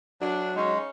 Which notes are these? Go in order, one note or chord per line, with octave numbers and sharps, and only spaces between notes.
F#3 D4
C#3 G#3 C#4 D#4